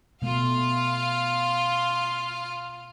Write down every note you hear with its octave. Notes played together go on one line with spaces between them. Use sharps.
B2 A3 F4 F5